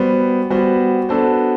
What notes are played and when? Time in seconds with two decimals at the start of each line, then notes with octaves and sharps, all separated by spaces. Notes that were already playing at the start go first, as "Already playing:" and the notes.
Already playing: G3 B3 F#4 C5
0.50 G3 B3 F#4 C5
1.09 B3 D4 F#4 A4 C5